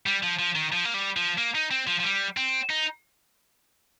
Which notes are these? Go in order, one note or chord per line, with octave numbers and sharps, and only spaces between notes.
G3
F3
F3
D#3
F3
A#3
G3
F3
A#3
D#4
C4
F3
F3
G3
C4
D#4